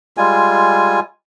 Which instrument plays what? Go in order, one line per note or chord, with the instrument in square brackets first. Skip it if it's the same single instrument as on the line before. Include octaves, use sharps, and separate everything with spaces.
[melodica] G3 G#3 F4 G#5